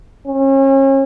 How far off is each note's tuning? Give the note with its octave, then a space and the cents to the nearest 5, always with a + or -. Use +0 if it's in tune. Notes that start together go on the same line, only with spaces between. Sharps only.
C#4 -35